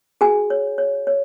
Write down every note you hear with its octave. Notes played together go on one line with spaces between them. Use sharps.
F#4 G#4 G#5
C#5
C#5
C#5